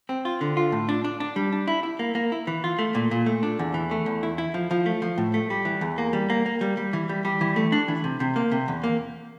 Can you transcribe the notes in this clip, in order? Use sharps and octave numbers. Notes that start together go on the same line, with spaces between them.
C4
F4
D3
F4
A2
D4
D4
D4
G3
D4
E4
E4
A#3
A#3
E4
E3
F4
A3
A#2
A#2
A3
D4
E2
E3
A3
E2
E4
E4
F3
F3
A3
F3
A2
A3
G3
E3
E2
A#3
G3
A#3
A#3
G3
G3
E3
G3
G3
E3
A3
D4
E3
C3
C3
A#3
C3
E2
A#3